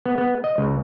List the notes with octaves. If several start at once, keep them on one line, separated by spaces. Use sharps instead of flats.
B3
B3
D#5
C#2